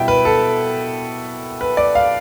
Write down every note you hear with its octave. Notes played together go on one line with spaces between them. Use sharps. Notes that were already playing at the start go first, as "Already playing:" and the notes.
Already playing: B2 G3 B3 E4 E5 G5
B4
A4
B4
D5
F5